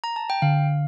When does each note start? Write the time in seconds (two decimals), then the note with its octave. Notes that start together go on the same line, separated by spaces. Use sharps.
0.04 A#5
0.16 A5
0.30 G5
0.42 D3 F5